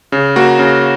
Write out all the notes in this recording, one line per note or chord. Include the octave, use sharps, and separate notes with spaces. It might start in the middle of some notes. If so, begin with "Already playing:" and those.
C#3
A#3 F#4
C#3